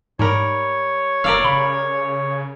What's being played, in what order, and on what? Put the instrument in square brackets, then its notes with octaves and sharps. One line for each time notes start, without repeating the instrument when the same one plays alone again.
[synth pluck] G#2 [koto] G3 A#4 [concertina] C#5
[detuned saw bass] E1 [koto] A#4 D5 F5 [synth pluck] E6
[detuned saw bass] C#3 [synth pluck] B5